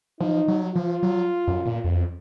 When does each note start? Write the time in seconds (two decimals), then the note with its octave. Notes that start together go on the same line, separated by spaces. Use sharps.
0.20 F3 D#4
0.48 F#3
0.74 F3 F4
1.03 F#3
1.48 F#2
1.66 A#2
1.84 F2